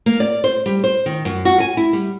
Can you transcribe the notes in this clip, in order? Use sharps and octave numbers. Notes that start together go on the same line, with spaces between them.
A#3
D5
C5
G3
C5
D#3
F#2
F#4
G#5
E4
G3